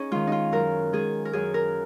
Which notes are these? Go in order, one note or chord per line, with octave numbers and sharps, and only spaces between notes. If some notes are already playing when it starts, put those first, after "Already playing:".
Already playing: C#4 D#4 G#4
D#3 G#3 F4
D#4 F4
F#2 A#4
D#3 G#3 G#4
A#4
F#2 G#4
A#4